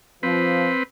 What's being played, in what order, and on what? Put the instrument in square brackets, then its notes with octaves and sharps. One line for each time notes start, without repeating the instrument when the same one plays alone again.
[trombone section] F3 [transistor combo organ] C4 B4